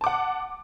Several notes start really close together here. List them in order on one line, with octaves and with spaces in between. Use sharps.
A5 D6 F#5